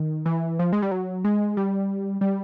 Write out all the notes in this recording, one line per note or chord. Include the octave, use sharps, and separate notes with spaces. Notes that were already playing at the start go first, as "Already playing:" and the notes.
Already playing: D#3
E3
F3
G#3
G3
F#3
G#3
G3
G3